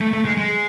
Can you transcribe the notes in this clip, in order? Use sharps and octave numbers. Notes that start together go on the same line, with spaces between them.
A3
A3
G#3
G#3